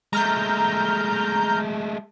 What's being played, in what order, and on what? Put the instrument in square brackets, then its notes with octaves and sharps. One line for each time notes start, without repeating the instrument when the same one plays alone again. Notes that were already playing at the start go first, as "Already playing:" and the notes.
[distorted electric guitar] G#3 A3 [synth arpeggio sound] A#5 F6 G6